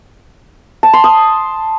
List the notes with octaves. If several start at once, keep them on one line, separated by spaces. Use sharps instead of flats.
A5
C6
D#6